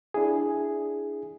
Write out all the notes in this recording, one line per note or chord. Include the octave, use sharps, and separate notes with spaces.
D4 E4 G#4